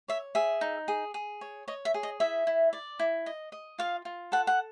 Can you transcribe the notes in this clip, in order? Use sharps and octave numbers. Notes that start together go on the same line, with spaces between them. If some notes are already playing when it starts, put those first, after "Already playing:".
C#5 E5
G#4 E5
D#4
G#4
G#4
C#5
C#5 D#5
E5
G#4
D#5
E4 E5
E4
D5
E4
D#5
D#5
F4 F5
F4
A4 F#5
F#5